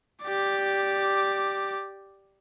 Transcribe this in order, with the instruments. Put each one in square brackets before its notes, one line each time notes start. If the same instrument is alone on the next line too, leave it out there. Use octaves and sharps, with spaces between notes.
[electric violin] G4 D5